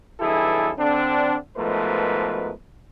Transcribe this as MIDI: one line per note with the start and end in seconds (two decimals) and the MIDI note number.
0.20 0.71 35
0.20 0.71 43
0.20 0.71 52
0.20 0.71 64
0.20 0.71 68
0.20 0.71 69
0.78 1.36 50
0.78 1.36 60
0.78 1.36 62
1.57 2.51 44
1.57 2.51 47
1.57 2.51 53
1.57 2.51 57
1.57 2.51 70
1.57 2.51 71